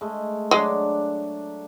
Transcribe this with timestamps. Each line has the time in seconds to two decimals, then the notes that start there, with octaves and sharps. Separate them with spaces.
0.01 G#3 A3
0.51 F#3 G#3 D4